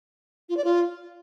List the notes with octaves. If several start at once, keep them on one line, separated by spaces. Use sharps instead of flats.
F4
D5
F4